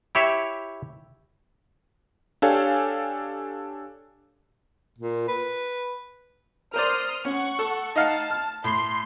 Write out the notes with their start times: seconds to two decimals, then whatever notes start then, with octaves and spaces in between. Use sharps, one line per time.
0.15 E4 G4 C#5 E5
2.42 D4 G4 A4 C#5 F5 G#5
4.98 A#2
5.28 B4
6.74 A#4 C5 D5 C6 D#6 F6
7.25 C#4 F#5 C#6
7.59 A4
7.96 D#4 F5 F#5 A5
8.30 F6
8.64 A2 C6